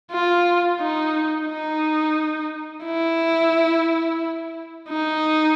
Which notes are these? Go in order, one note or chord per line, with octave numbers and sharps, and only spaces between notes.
F4
D#4
D#4
E4
D#4